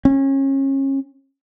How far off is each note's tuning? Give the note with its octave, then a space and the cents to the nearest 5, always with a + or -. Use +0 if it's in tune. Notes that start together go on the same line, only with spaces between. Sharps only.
C#4 -30